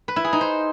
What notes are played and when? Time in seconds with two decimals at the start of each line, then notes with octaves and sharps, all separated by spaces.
0.08 B4
0.16 E4
0.24 G#4
0.33 D#4
0.41 C5